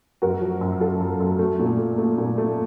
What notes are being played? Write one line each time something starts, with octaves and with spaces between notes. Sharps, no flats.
F#2 F#4 A#4
F3
F#2
F#2 F4 A4
F#2
F#2
A3
A#2
A3
A3
A#2
A3